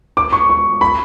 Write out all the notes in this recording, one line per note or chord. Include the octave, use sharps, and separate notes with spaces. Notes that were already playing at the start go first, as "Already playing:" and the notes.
D6
C#6
C#6
B5